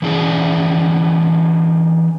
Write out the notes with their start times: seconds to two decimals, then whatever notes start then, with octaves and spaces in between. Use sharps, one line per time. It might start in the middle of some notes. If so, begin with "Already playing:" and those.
0.02 E3 C#4 D4 G#4